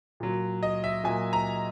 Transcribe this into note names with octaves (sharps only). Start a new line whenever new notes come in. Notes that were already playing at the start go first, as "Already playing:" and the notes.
A#2 F#3
D#5
E5
A#2 F#3 G#5
A#5